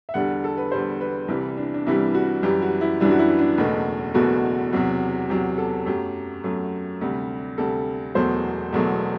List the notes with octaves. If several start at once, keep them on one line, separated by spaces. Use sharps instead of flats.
E5
E2 D3 G3 F#5
A4
B4
E2 D3 G3 C5
B4
C2 C3 E3 G3
D4
D4
C2 C3 E3 G3 E4
F#4
F#2 E3 G3 G4
F#4
E4
F#2 E3 G3 D4
F#4
E4
D4
F#1 E2 B2 A3
F#1 E2 B2 A3 F#4
E2 C3 F#3
E2 C3 F#3 G4
A4
F#2 F#3 A3 G4
F#2 F#3 A3
D2 C3 G3
D2 C3 G3 A4
E1 E2 B2 F#3 A3 C5
E1 E2 B2 F#3 A3